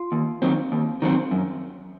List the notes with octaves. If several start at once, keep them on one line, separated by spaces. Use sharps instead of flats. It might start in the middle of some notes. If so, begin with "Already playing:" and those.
Already playing: F4
D#2
D#3 F#3 C4
D#2
D#3 F#3 C4
F#2